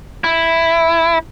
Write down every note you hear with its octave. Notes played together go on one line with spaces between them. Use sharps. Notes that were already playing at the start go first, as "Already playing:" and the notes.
E4